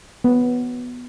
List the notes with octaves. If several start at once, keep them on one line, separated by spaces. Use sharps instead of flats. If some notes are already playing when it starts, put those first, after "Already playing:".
B3